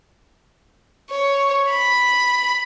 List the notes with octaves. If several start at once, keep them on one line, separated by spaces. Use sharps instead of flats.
C#5
B5